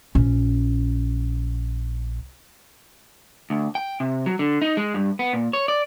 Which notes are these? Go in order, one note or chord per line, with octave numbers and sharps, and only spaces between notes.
A#1 C#4
D2
G5
C3
F#3
D3
D#4
G#3
G2
B3
A#2
C#5
D5